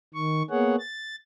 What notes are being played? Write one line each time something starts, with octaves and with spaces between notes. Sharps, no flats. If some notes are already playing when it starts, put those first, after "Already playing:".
D#3 C#6
A#3 B3 G#4 C#5 F#5
A6